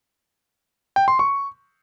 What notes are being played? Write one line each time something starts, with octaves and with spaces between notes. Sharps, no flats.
G5
C6
C#6